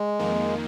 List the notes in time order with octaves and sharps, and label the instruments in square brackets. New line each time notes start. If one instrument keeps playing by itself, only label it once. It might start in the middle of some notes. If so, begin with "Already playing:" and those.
Already playing: [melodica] G#3
[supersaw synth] F2 D#3 A#3